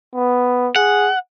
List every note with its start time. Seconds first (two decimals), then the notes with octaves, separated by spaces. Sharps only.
0.14 B3
0.76 G#4 F#5